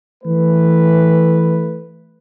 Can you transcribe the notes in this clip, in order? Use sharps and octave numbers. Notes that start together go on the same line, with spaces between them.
E3 A3 B4